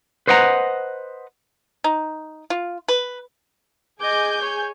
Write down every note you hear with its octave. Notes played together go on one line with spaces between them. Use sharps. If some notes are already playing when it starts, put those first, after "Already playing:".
B4 C5 D#5 F#5 G5 A#5
D#4
F4
B4
G#4 D#5 G#5 D6 G6
C#5